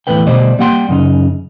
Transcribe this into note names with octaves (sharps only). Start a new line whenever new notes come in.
E2 A2 D3 B4 G5
D2 B2 G3 C5 D5 D#5
G3 A#3 G4 F#5 G5 C6
F#2 C#3 D#4